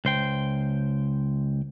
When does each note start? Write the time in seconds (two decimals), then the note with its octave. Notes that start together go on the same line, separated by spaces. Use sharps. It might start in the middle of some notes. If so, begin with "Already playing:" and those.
0.05 C#2 C5 G5